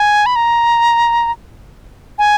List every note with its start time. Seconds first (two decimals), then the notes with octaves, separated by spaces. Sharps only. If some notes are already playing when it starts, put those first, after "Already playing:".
Already playing: G#5
0.26 B5
0.36 A#5
2.18 G#5